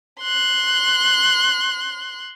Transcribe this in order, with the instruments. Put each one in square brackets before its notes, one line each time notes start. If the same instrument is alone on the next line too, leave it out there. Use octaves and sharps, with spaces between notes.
[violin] C6 F#6